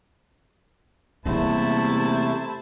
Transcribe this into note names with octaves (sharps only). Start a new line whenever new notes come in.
E2 C3 G3 A3 A#3 E4 C5 A5